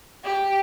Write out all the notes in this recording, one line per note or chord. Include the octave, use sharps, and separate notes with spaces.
G4